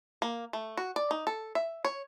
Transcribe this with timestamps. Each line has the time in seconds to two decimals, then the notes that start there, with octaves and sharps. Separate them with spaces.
0.22 A#3
0.53 A3
0.77 F#4
0.96 D5
1.11 D#4
1.27 A4
1.55 E5
1.85 C#5